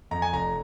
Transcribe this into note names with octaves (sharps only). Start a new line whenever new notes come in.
F2 A#5
G#5
F1 A#5